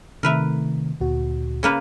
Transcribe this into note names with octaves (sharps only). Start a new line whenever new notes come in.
C3 D#3 A3 A#4 B4 E5
D2 A#2 F#4
C#3 A#3 B4